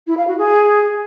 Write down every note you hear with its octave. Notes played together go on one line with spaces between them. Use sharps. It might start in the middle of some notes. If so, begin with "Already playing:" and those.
E4
F5
F#4
G#4